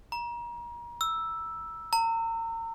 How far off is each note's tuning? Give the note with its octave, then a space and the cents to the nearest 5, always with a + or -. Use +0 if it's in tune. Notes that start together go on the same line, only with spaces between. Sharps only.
A#5 +35
E6 +0
A#5 -35